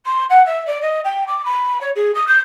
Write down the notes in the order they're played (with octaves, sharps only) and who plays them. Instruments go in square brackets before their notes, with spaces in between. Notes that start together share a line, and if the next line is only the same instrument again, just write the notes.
[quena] C6
F#5
E5
D5
D#5
G5
D6
B5
C#5
G#4
D#6
G6